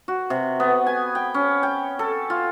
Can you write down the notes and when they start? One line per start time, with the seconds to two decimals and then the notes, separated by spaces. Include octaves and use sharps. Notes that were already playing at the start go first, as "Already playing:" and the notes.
0.08 F#4
0.30 C3
0.60 B3
0.87 G#5
1.15 G5
1.34 C#4
1.63 G5
1.99 A4
2.30 F4